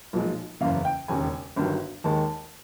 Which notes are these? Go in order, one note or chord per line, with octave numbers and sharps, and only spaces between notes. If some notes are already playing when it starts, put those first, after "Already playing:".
B1 A#2 F3 G#3
F#1 E2 C#3 F5
G5
E1 D#2 C#3 G#5
G1 G2 D#3 F#3
D#2 D#3 G#3 A5